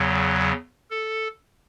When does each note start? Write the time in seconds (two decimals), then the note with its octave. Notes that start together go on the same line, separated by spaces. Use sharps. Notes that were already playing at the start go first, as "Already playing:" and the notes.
Already playing: E2 C#3 F#3
0.90 A4